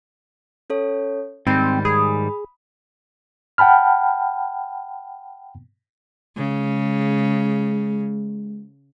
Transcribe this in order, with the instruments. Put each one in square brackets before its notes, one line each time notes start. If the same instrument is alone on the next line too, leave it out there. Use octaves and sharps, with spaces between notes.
[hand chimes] C#4 A4 C#5
[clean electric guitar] G#2 D#3 G3 [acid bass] C4 [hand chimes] B5 G6 A6
[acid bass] G#4 [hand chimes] B5 D#6
[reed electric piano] F#5 G5 A5 B5 F6
[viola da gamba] C#3 [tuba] G#3